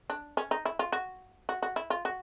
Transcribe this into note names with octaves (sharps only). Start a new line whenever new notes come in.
D4
C#4
D#4
E4
F4
F#4
F#4
F#4
E4
F4
F#4